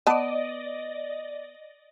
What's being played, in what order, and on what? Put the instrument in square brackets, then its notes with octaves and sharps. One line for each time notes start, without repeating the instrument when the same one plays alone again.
[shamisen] B3 A5 [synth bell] D5 D#5